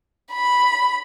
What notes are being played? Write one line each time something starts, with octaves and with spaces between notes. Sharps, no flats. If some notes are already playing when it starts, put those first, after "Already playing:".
B5